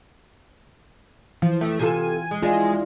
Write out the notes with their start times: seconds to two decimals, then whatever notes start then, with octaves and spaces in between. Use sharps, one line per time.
1.42 E3 F3
1.61 F2 A3
1.79 C3 F4 G#4 A4 G#5
2.31 G#3
2.42 E2 G#3 D4 E4 F4 G#4